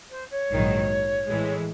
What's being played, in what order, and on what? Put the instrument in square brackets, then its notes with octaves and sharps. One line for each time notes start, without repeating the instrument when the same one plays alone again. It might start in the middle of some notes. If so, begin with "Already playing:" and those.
[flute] C5
C#5
[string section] A#1 G#2 D#3 F#3
A2 E3 G#3